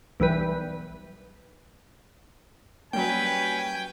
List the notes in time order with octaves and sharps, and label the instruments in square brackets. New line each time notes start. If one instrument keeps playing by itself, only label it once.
[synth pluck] B1 E3 G3 B4
[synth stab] F#3 G3 A#3 [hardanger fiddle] C#4 B4 [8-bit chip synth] G5 [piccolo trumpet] G#5